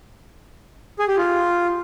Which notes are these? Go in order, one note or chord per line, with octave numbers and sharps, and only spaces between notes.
G#4
G4
F4